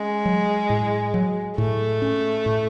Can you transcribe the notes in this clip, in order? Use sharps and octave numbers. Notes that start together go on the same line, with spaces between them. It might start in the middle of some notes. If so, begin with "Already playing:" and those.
Already playing: G#3 C#4
F#3
A2
F#3
A2 A3
C#4
A2